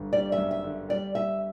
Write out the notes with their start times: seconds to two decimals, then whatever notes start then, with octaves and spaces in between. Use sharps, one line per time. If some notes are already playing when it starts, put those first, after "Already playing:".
Already playing: G1 D3 G3
0.13 G3 D5
0.32 E5
0.38 F#2
0.51 E5
0.64 D3
0.89 G3 D5
1.14 G3 E5